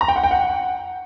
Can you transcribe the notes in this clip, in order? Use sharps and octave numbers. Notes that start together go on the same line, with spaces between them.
A#5
G5
F#5
G5
F#5